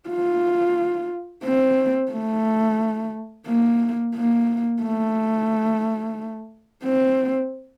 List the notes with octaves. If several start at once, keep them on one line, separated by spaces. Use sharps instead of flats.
F4
C4
A3
A#3
A#3
A3
C4